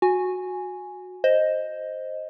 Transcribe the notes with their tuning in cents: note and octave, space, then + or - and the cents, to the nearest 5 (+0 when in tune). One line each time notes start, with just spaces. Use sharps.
F#4 -15 G#5 +0
C5 +5 D#5 +0